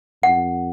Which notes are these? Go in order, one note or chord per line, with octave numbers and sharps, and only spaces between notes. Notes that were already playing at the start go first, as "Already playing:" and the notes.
F2 F#5